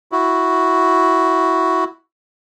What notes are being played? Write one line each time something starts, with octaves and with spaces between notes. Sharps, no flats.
E4 F#4